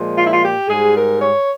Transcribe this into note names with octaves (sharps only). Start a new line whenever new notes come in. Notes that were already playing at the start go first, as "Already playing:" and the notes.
Already playing: A#2 F3 G#3
F4
E4
F4
G4
G#2 G3 G#4
A#4
C#5